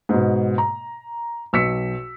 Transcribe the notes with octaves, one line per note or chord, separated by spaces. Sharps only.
G#2 B2
A#5
B1 E6 B6 C#7